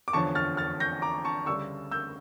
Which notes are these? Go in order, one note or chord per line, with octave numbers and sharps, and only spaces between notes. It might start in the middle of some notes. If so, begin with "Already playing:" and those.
D6
E2 D3 F3 C#4 A5 C#6
F6 A6
F6 A6
G6 A#6
A#5 D6
A5 C#6
D2 C#3 G3 D4 C#6 E6
E6 G6